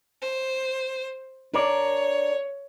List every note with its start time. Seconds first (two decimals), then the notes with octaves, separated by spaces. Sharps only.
0.22 C5
1.53 D4 A#4 C#5 D5